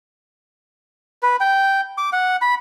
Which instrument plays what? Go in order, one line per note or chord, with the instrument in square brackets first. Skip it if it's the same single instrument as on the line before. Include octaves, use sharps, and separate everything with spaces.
[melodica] B4
G5
D6
F#5
B5